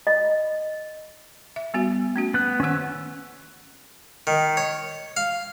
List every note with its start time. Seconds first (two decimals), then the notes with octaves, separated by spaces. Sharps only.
0.07 D#5
1.56 E5
1.74 G3 B3 F#4
2.16 A3 C#4 F#4
2.34 B3 F#6
2.60 D#3 C#4 F#5 E6
4.27 D#3
4.57 C#5
5.17 F5